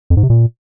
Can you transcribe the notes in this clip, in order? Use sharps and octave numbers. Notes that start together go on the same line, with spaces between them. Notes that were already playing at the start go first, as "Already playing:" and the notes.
F2
G#2
C3
A#2